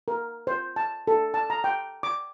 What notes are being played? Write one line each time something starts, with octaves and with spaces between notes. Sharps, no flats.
A#4
C5
A5
A4
A5
A#5
G5
D6